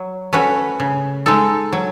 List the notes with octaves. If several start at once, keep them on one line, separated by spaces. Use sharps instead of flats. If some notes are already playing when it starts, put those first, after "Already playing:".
Already playing: F#3
A3 C#4 F#4 B4
C#3
G#3 D#4 A4
F#3